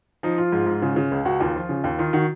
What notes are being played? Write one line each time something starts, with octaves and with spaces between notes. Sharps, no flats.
F3 D#4
F3 F4
G#2
G#2
C#3
C#3
C#2
C#2 F#4
D#2 F4
F3
C#3
D#2
D#3 F4
D#3 F#4